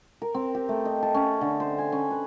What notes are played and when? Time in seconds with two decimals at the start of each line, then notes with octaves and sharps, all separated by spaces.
0.22 A#4
0.34 C4
0.55 G4
0.69 A3
0.85 D#5
1.03 A5
1.14 C#4
1.41 D3
1.60 C5
1.78 G#5
1.92 C#4
2.11 B4